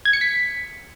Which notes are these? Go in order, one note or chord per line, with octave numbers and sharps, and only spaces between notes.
G#6
C#7
B6